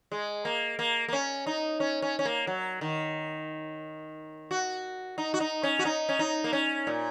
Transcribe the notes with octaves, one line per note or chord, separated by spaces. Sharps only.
G#3
A#3
A#3
A#3
C#4
D#4
C#4
C#4
C#4
A#3
F#3
D#3
F#4
D#4
F#4
D#4
C#4
F#4
D#4
C#4
D#4
A#3
C#4
A#2